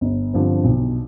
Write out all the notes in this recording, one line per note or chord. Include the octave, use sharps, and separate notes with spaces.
G1
G2 D3 F3 C4
B1